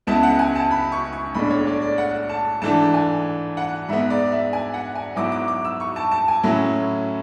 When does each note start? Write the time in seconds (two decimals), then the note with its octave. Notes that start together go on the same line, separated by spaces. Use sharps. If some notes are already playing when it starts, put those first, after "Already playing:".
0.07 C#2 C#3 G#3 B3 E4 A5
0.23 F#5
0.39 G#5
0.55 A5
0.71 B5
0.92 C#6
1.13 C#6
1.34 B1 A2 G#3 D4 B5
1.50 C#5
1.67 D5
1.82 D5
1.98 F#5
2.29 A5
2.62 G#2 E3 A3 D4 A5
2.94 G#5
3.57 F#5
3.89 G#2 G#3 B3 E5
4.10 D5
4.32 E5
4.53 G#5
4.74 F#5
4.95 G#5
5.16 G#2 F#3 B3 E4 D6
5.32 D6
5.48 D6
5.65 E6
5.80 C#6
5.96 A5
6.11 A5
6.28 G#5
6.43 A2 F#3 C#4 E4